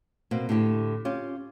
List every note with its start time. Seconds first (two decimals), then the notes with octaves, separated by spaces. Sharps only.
0.31 B2 A#3 C4
0.49 A2 D3 G4
1.05 C#4 F4 G4